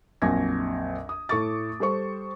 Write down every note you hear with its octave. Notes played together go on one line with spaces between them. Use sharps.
A#1 F2 F#3 G#5 G#6 A#6
D#6
A2 A4 C#6 D6 A6
G3 A4 C5 C#6